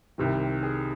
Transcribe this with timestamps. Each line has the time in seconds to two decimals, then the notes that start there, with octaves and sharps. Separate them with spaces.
0.18 C2 C3 D#3
0.63 G#4